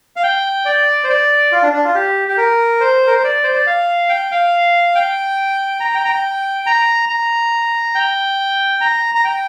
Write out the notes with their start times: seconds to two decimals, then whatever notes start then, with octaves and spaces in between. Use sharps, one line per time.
0.16 F5
0.23 G5
0.65 D5
1.04 C5
1.09 D5
1.52 F4
1.63 D4
1.73 D4
1.84 F4
1.95 G4
2.28 G4
2.38 A#4
2.80 C5
3.07 A#4
3.15 C5
3.24 D5
3.44 C5
3.54 D5
3.67 F5
4.09 G5
4.31 F5
4.95 G5
5.80 A#5
5.95 G5
6.05 A#5
6.09 G5
6.66 A#5
7.09 A#5
7.95 G5
8.81 A#5
9.15 A#5
9.24 G5